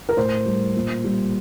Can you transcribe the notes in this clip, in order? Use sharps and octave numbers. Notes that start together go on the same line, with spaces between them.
A#4
A2 C5
G3
A#2
G3